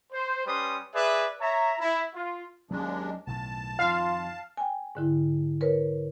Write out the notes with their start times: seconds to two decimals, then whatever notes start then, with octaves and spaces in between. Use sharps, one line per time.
0.13 C5
0.46 G3 C#4 B4 C6 D#6
0.94 G#4 B4 D5 E5
1.41 C#5 E5 A#5
1.79 E4
2.14 F4
2.71 D#2 F#3 G#3 C#4 D4
3.27 B1 A2 D#3 A5
3.79 F2 D#3 F4 F5
4.57 G5 G#5
4.95 G#2 D3 E4
5.61 A#4 B4 C#5